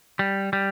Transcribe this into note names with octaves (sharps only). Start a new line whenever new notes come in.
G3
G3